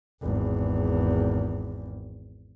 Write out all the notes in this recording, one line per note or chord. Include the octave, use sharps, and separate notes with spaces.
G#1 E2